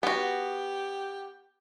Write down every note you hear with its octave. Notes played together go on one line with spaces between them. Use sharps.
B3 F#4 G4